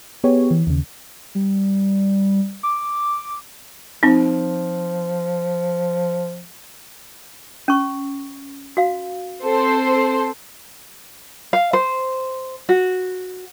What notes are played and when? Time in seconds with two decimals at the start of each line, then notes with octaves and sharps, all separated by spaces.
0.24 B3 G4 G#4 C#5
0.51 E3
0.67 D#2 C#3
1.35 G3
2.63 D6
4.03 F3 C4 D#4
7.68 C#4 C#6
8.77 F#4 F5
9.45 C4 A4 C5
11.53 F5
11.73 C5
12.69 F#4